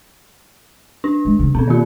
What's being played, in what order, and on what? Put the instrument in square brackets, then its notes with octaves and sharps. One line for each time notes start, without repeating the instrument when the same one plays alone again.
[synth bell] D4
[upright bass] G#3
C#3 F#3
[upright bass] B2 [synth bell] B3 C4
[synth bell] D#3 A#3 F4